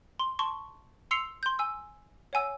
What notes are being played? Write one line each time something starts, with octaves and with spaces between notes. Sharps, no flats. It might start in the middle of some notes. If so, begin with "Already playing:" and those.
C6
A5 C6 C#6
C6 E6 C7 C#7 F7
C6 G6
G#5 E6
C#5 F#5 G#5 E6